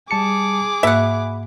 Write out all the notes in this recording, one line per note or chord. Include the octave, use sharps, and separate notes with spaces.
G3 G#4 A5 D6 C#7
G#2 A#3 E5 F#5 B5